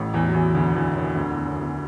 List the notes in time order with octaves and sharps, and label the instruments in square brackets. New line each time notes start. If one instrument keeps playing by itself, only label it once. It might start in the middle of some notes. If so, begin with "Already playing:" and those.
Already playing: [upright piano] A1 A2
E2 E3
F#3
E2 E3
D2 D3
E2 E3
F#2 F#3
D2 D3
E2 E3
F#2 F#3
E2 E3